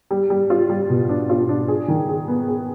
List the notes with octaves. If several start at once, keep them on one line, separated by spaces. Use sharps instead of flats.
G3
G3
F4
G3
B2
D4
F4
D4
G#4
D#3
G#4
B3
G#4